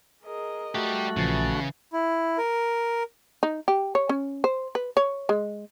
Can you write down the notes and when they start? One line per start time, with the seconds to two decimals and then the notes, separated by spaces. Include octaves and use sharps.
0.22 G#4 A#4 D#5
0.75 G3 A3 F#4 G4
1.17 A#1 C#3 E3 F3 A6
1.93 E4
2.38 A#4
3.43 D#4
3.68 G4
3.95 C#5
4.09 C#4
4.44 C5
4.75 B4
4.97 C#5
5.29 G#3